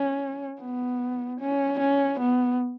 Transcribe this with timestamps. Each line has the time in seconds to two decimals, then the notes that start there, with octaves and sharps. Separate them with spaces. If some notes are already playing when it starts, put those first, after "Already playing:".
Already playing: C#4
0.61 B3
1.40 C#4
1.79 C#4
2.20 B3